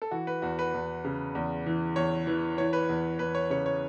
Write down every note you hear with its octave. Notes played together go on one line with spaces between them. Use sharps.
A4
E3 F#4
B4
E2 F#4
B4
E2
C#3
E2
E3
E2 C#5
E3 B4
E3 C#5
B4
E2
E2 B4
C#5
C#3 C#5
C#5